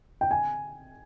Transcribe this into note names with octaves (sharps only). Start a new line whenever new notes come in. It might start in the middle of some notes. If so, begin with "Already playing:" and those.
G5
G#5